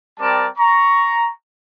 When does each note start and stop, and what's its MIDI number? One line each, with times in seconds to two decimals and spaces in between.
0.20 0.47 55
0.20 0.47 60
0.20 0.47 70
0.20 0.47 74
0.20 0.47 81
0.20 0.47 86
0.58 1.30 82
0.58 1.30 85